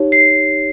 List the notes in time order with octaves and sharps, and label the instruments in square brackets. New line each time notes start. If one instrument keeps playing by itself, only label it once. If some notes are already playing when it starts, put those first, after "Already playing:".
Already playing: [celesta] D#4 G4 C#5
C7